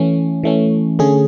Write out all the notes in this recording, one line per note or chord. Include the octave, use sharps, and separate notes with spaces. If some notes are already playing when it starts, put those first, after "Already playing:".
Already playing: E3 A3 C#4
E3 A3 C#4
D3 A3 C#4 G#4